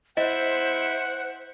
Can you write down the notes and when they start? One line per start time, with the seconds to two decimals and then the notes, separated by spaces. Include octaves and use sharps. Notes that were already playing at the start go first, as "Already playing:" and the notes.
0.17 E4 C5 D#5 F#5